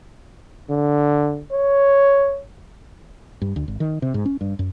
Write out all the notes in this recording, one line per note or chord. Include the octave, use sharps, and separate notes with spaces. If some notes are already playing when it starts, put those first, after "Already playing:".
D3
C#5
G2
D2
G#1
D#3
C3
G#2
C#4
G2
F#2